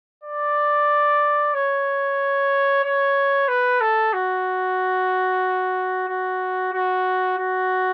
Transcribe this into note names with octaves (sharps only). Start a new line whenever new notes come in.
D5
C#5
C#5
B4
A4
F#4
F#4
F#4
F#4